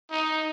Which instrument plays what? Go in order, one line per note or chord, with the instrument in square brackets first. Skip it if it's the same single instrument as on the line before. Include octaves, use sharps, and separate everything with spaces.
[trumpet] D#4